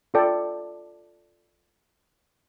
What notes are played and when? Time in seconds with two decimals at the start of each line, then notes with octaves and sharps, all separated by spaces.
0.14 F4 A4 D5 G5